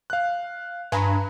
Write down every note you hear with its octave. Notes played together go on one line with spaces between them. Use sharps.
F5 F#6
G2 G#5 A#5 B5